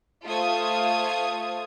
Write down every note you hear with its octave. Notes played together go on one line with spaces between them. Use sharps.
A3 F4 A4 C5 D#6 G#6